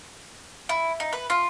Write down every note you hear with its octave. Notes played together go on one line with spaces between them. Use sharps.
E4
D#4
B4
F4